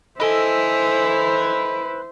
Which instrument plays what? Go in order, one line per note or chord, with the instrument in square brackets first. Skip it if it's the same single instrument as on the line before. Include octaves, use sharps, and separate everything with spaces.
[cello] E4 [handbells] A4 D#5 [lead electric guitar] B4 G#5 [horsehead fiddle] C5